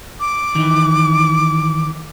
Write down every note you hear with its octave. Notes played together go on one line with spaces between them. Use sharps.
D6
D#3 E3